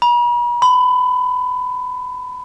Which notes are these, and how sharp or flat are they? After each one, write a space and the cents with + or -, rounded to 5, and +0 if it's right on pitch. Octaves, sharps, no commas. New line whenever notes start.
B5 -45
B5 +25